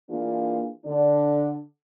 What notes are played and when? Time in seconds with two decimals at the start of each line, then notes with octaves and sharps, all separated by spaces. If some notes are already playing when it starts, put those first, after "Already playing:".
0.10 E3 A#3 D4 F4 G#4
0.86 D3 D4